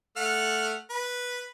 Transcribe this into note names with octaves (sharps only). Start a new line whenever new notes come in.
A3 F#5 F6
B4